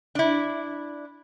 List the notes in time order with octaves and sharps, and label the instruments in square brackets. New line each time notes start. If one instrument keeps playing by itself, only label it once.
[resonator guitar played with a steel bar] D4 E4